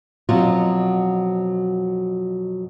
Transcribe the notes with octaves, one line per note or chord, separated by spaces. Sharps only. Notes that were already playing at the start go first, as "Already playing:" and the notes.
F2 B2 F#3 C4 F4